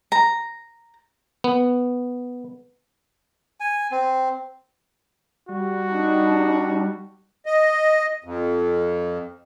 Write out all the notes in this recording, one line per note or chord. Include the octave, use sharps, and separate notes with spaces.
A#5
B3
G#5
C4
G3 F#4
D4 D#4
D#5
F2